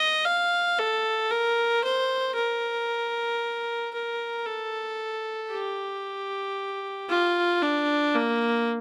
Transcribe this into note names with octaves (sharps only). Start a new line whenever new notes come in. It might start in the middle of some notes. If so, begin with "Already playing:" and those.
Already playing: D#5
F5
A4
A#4
C5
A#4
A#4
A4
G4
F4
D4
A#3